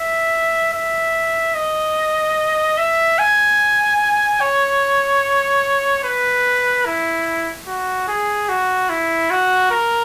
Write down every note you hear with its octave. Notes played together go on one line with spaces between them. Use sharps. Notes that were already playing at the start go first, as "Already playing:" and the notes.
Already playing: E5
E5
D#5
E5
G#5
C#5
B4
E4
F#4
G#4
F#4
E4
F#4
A#4